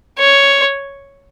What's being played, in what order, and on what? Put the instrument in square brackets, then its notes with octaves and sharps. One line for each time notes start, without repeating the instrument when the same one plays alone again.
[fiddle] C#5